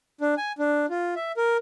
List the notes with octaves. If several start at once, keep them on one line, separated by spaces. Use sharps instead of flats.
D4
G#5
D4
F4
E5
A#4